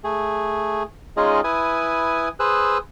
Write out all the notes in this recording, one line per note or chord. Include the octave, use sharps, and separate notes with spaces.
A3 G#4
G#3 C#4 D#4 F4 G#4 D#5
E4 B4 G#5 D#6
G#4 B4 C5 D#6 E6 F#6